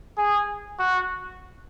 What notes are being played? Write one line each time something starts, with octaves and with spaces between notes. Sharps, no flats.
G#4
F#4